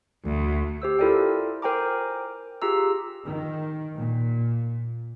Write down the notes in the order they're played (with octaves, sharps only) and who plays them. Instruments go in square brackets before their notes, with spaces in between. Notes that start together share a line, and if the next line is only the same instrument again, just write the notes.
[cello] D2
[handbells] G4 C5 E6
E4 F4 A4 A#4 D5 G5
A#4 C5 G5 G#5 A#5 D6
F4 G4 G#4 A#5 E6
[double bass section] D#3
A#2